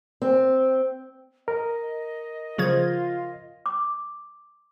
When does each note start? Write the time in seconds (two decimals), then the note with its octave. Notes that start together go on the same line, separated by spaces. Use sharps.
0.22 C4
1.48 A#4 D#5
2.58 C#3 F3 F4 G#6
3.66 D6